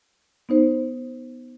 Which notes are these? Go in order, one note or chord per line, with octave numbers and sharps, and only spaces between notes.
B3 D#4 C5